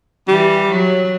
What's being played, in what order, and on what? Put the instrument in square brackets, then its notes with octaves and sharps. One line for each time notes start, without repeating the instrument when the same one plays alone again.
[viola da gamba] E3 [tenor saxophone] G3
[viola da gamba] F#3